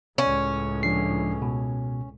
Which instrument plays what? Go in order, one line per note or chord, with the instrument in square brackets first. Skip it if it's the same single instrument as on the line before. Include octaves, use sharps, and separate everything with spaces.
[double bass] C#2 A2 [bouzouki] C#4
[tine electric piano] F3 D4 C7
B2